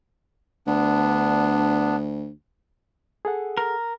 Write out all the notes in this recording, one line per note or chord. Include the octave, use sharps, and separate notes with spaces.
D2 B3 D4
G#4 A4 F#5
A#4